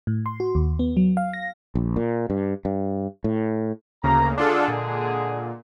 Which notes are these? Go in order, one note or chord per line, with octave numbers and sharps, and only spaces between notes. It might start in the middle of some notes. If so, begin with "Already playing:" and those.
A2
C6
F#4
D#2
B3
F#3
F5
A#6
A#1
A#2
G2
G2
A2
D2 C#3 A#3 A#5
D3 G#3 D4 F4 G#4 A4
A#2